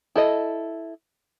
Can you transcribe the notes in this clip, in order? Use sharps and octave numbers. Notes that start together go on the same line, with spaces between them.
E4 A4 D#5